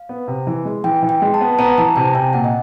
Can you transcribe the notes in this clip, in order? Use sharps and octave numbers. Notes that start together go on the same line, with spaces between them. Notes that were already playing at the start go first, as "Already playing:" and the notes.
Already playing: F5
B3
C3
E3
G#3
E3 G5
E3
G5
G#3
A5
B3
B3 A#5
E3 A5
C3 G#5
C3 G5
A#2 F#5
D#5